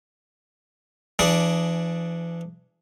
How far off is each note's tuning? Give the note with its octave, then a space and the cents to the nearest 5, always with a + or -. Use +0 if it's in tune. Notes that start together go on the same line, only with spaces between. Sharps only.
E3 +40 D4 +0 G#4 +10